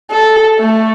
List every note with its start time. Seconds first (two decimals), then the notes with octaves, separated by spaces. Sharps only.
0.11 A4
0.59 A3